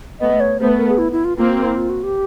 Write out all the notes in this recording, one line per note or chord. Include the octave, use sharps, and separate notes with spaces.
A3 B3 D#5
C#5
A3 B3 C5
B4
A#4
G#4
E4
E4
F4
A#3 C4 F4
F#4
E4
F4
F#4
G4